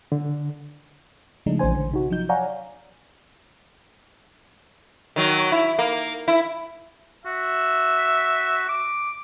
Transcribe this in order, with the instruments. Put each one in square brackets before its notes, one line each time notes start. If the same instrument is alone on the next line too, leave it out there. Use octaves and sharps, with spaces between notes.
[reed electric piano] D3
[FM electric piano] C#3 F3 G#3 A3 D4 D#4
A#1 E3 C#4 C5 G#5
D3
C3 D#4 F#4
F3 F#3 D#4 G6
C#5 D5 F5 F#5 G#5 A#5
[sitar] D#3 F#3
E4
A#3
E4
[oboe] F#4 [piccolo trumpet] E5
[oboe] D6